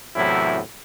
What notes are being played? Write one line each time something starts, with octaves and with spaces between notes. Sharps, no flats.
E2 A2 C3 F#3 E4